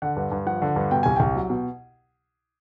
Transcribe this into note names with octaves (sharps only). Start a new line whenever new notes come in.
D3 F#5
G2
G2
F3 F#5
D3
G2
B2 G5
C2 G#5
C2 G5
F#3
B2